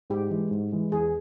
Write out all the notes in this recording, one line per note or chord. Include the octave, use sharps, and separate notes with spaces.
G#2 G4
E3 G#3
G#2
E3 G#3
E2 G#4